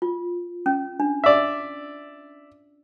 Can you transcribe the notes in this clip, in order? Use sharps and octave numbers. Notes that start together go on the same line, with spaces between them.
F4
C#4
D4
D5 E5